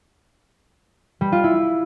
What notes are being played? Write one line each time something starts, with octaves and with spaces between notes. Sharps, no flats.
G3
F4
E4